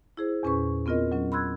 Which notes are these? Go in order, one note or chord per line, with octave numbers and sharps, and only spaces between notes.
E4 G#4 C5
E2 A#2 C#4 G#4 B4 C#6
B3 C4 F4 A#4 D#5
F#3 C#4
B5 C6 E6 F#6 G#6